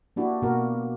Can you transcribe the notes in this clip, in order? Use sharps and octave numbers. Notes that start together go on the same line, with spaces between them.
A#3 D4 E4 F#4 G4
B2 A#3 F#4 A#4